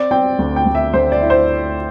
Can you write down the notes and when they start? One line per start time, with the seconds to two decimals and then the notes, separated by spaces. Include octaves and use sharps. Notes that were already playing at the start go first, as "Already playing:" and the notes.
Already playing: C4 D5
0.11 C4 G5
0.39 D2
0.56 G5
0.66 D2
0.75 E5
0.93 D2 C5
1.12 D5
1.21 E4
1.30 C5